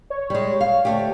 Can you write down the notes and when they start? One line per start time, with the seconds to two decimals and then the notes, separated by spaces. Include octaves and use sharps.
0.10 C#5
0.30 G3 G#3
0.61 F5
0.85 D2 A3 G4